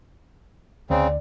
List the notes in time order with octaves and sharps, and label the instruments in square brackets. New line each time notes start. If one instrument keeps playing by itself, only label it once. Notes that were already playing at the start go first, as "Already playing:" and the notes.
[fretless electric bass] D2 [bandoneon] C#3 C4 [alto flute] D5